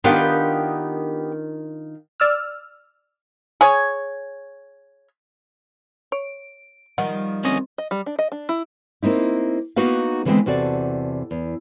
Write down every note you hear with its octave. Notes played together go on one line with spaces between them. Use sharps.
D#3 B3 D4 F4 G4
D5 E6 F6
G#4 C#5
C#5 D7
D#3 F3 G3 D#5 F#5
D2 C4 C#4 D#5
D#5
G3
D4
D#5
D4
E4
A#3 C4 D#4 E4
A#3 B3 D#4 F#4 B4 F5
D3 E3 G#3 A3 B3 C4
E2 C3 F#4 A4 D5
E2